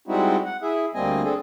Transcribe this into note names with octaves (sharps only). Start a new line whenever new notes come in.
G3 G#3 C4 D#4 E4 F#4
F#5
E4 G#4 E5
D2 G3 A#3 C4 D#5 G#5
C4 D4 G#4 A4